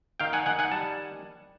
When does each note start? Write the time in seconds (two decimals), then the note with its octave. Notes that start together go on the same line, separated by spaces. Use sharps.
0.20 D#3 F5 G5
0.33 F#5 G#5
0.46 D#3 F#5 G#5
0.59 F#5 G#5
0.72 G3 A5